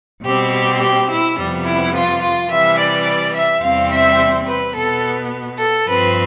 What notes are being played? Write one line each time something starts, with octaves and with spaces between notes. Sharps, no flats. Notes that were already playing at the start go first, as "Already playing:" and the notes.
B2 G3 C4 G4
G4
G4
E4
F2 C3 G3 B3
E4
F4
F4
C3 E3 G3 E5
D5
E5
E2 C3 G3 C4 F5
E5
B4
B2 B3 A4
A4
G2 F3 C4 B4